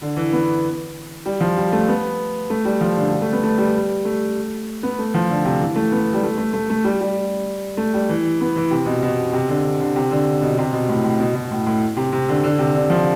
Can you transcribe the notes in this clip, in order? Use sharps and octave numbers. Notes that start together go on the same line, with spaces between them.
D3
E3
B3
G3
F3
G3
A3
B3
A3
G3
F3
D3
G3
A3
B3
A3
G3
A3
B3
A3
F3
D3
C3
E3
A3
B3
G3
A3
A3
A3
A3
G3
G3
A3
G3
E3
B3
E3
C3
B2
B2
C3
D3
D3
C3
D3
B2
C3
B2
A2
A2
B2
B2
A2
A2
C3
C3
D3
D3
C3
D3
F3